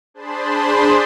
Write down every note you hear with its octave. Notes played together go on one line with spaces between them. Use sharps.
D4 G#4 C5 A5 B5 C6